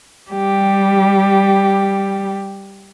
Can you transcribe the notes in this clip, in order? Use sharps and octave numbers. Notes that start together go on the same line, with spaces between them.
G3 G4